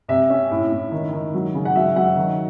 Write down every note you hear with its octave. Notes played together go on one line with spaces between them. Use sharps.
C3 E5
C#4
A2
A2
D#3
D#3
F#3
C#3
F#5
F#3 E5
F#3 F#5
D#3